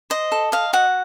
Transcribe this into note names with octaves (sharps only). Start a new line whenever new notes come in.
C5 D#5
A4
D#5 F5
F#4 F#5